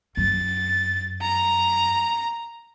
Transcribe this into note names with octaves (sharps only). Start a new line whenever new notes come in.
F#2 A6
A#5